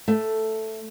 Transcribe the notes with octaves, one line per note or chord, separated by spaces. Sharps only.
A3